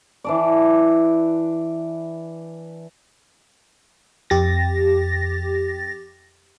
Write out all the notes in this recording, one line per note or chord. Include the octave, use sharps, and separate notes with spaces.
E3 D4 D5
F2 G4 A6 A#6